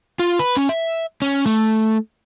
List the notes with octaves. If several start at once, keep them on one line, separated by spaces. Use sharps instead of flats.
F4
B4
C#4
E5
C#4
A3